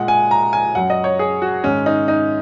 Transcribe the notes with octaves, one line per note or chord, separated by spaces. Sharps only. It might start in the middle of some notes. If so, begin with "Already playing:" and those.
Already playing: A#2 G#3 F#5
G#5
A#5
G#5
F#2 F#3 F#5
D#5
C#5
G#4
F#4
G#2 D#3 G#3 C#4
D#4
D#4